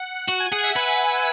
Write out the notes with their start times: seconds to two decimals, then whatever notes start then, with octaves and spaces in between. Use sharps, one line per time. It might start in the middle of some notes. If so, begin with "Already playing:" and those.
Already playing: F#5
0.27 F#4 F#5
0.40 G#5
0.52 G#4 F#5
0.64 E5
0.76 B4 G#5